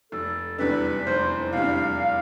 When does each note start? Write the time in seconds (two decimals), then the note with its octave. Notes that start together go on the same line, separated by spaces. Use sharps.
0.12 F1 A4
0.59 E2 C3 G3 D4 B4
1.07 F1 C5
1.53 E2 C3 G3 D4 F5
1.77 F5
2.00 F5